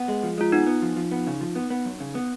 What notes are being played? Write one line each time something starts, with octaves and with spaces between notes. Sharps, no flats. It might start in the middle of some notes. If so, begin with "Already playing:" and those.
Already playing: B3
G#3
F3
G#3 F4
B3 D#4
B3
F3
F3
B3
C#3
F3
B3
B3
F#2
C#3
B3